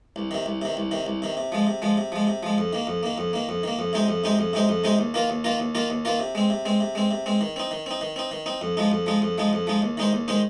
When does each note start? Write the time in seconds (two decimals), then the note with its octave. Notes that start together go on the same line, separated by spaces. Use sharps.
0.16 C2
0.31 C3 D#3
0.46 C2
0.62 C3 D#3
0.77 C2
0.91 C3 D#3
1.07 C2
1.22 C3 D#3
1.37 C3
1.52 F3 G#3
1.67 C3
1.82 F3 G#3
1.97 C3
2.12 F3 G#3
2.27 C3
2.43 F3 G#3
2.58 F2
2.73 D#3 A#3
2.87 F2
3.03 D#3 A#3
3.18 F2
3.33 D#3 A#3
3.49 F2
3.63 D#3 A#3
3.79 F2
3.93 C3 G#3 D#4 C5
4.08 F2
4.24 C3 G#3 D#4 C5
4.39 F2
4.53 C3 G#3 D#4 C5
4.69 F2
4.84 C3 G#3 D#4 C5
4.99 D#2
5.14 D#3 A#3 F4 A#4
5.30 D#2
5.44 D#3 A#3 F4 A#4
5.60 D#2
5.75 D#3 A#3 F4 A#4
5.90 D#2
6.05 D#3 A#3 F4 A#4
6.19 C3
6.35 G#3 C4
6.50 C3
6.65 G#3 C4
6.80 C3
6.95 G#3 C4
7.11 C3
7.26 G#3 C4
7.41 D#3
7.56 C4 D#4
7.71 D#3
7.86 C4 D#4
8.01 D#3
8.16 C4 D#4
8.31 D#3
8.46 C4 D#4
8.61 F2
8.77 F3 G#3 D#4
8.92 F2
9.06 F3 G#3 D#4
9.22 F2
9.38 F3 G#3 D#4
9.53 F2
9.67 F3 G#3 D#4
9.82 D#2
9.97 D#3 G#3 D#4 C5
10.13 D#2
10.28 D#3 G#3 D#4 C5